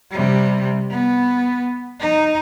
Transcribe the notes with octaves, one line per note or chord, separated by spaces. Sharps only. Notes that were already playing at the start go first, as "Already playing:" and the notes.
C3 G3
B3
D#4